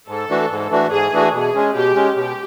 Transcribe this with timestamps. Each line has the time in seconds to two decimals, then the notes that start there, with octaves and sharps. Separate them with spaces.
0.08 G#2 A4
0.29 E3 A3 D4 F#4
0.51 G#2
0.71 E3 A3 D4 F#4
0.91 G#2 G#4
1.13 E3 A3 D4 F#4
1.33 B2 G#4
1.55 G#3 C#4
1.75 B2 G4
1.95 G#3 C#4
2.16 B2 G4